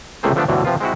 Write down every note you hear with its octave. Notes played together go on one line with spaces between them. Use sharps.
C#2 C3 A3 A#3 G#4 C5
D3 F3 A3 B3 D4
D2 G2 B2 D3 E3 F#3
C3 F3 B3 F4
G#3 C4 E4 F#4